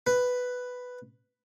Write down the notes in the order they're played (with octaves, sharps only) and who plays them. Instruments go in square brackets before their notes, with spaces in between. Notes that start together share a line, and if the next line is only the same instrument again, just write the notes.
[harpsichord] B4